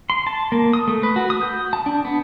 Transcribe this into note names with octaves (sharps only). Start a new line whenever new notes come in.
C6
A5
A#3
D#6
A3
B4
F#4
D#6
G6
A5
D4
B3